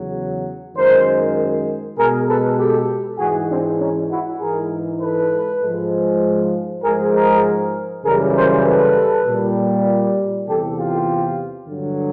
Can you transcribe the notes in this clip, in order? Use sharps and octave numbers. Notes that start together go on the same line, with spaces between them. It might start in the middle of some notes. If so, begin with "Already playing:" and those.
Already playing: E2 C#3 F#3
F#2 D#3 G#3 A#4 C5
B2 G#3 G#4 A#4
A4 B4
G4 A4
G#2 E3 G#3 F#4 G#4
C4 D4
C#4 D#4
E4 F#4
G#2 E3 G#3 G#4 A#4
A4 B4
G#2 F3 G#3
G#2 F3 G#3 G#4 A#4
G#4 A#4
F#2 C#3 E3 G3 G#4 A#4
A#4 C5
A4 B4
A#2 G3
E2 C3 E3 G4 A4
F4 G4
G2 D3 F#3